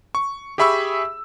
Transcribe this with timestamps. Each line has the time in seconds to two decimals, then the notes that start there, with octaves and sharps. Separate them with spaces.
0.15 C#6
0.58 G4 G#4 E5 B5 C#6 E6